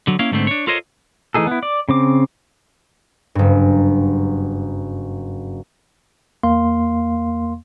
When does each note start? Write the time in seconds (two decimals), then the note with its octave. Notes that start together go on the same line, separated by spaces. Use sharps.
0.07 D3 F#3
0.19 A#3 C#4 E4 F5
0.32 G#2 D3 A3 B3 C4
0.47 D4 C#5
0.67 F4 A4 A#4 C5 C#5 D#5
1.34 E3 A3 D#4 G#4 A4
1.47 B3 E4
1.63 D5
1.89 C#3 C4 D6
3.35 F#1 G2
6.43 E2 A#3 F5 C6